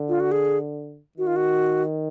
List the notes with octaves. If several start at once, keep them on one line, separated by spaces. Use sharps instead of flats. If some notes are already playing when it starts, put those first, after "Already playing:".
Already playing: D3
F4
F#4
G#4
D#3 F#4
F4
F#4